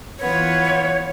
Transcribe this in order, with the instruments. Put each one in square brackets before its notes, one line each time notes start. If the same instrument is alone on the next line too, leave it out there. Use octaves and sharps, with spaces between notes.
[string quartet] E3 B3 F4 [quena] C#5